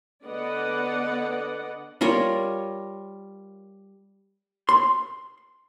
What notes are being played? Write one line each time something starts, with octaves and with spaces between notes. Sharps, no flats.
D3 B3 D5 D#5 F#5
G3 F4 A#4 C#5
C6